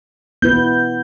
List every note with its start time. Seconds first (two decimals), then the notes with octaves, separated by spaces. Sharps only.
0.42 B3 E4 B4 G6